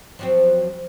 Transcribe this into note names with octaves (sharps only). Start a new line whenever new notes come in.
F3 F#3 C4